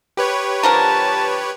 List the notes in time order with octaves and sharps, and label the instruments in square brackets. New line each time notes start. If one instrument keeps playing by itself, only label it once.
[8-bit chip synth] G4 B4 C#5
[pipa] D3 F3 A#4 [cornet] A5